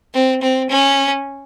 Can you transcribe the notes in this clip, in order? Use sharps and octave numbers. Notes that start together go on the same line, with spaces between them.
C4
C4
C#4